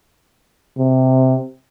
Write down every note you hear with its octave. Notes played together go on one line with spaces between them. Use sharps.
C3